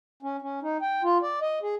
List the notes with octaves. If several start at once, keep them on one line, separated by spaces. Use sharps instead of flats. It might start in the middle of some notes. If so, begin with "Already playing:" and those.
C#4
C#4
D#4
G5
F4
D5
D#5
G#4